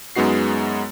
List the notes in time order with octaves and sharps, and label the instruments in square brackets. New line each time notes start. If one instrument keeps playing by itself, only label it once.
[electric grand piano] F#2 G#3 B3 D#4 F#4 C7